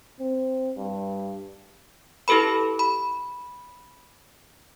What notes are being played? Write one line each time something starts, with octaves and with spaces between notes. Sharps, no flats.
C4
G2
E4 G4 A4 B4 B5
B5